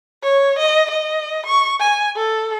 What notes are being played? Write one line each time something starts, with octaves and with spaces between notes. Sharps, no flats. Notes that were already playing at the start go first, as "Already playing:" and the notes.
C#5
D#5
D#5
C#6
G#5
A4